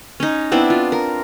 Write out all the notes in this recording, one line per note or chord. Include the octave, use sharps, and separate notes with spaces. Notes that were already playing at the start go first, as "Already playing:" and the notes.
C#4 D#4
B3 C4 D4 E4
F4
A#4